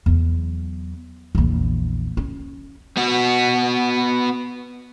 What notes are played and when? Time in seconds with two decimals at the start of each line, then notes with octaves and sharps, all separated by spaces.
0.06 E2 F#3
1.35 A#1 E2
2.17 C#4
2.97 B3 F#4